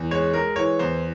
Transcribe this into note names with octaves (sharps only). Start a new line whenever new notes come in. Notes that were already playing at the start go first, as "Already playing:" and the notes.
Already playing: E2
G#3 C#5
G#3 A#4
E3 C#5
E2 C5